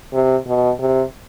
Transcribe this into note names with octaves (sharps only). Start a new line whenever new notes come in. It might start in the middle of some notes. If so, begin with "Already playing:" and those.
C3
B2
C3